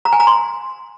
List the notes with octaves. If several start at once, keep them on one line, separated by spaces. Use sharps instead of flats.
A#5
G#5
A#5
C6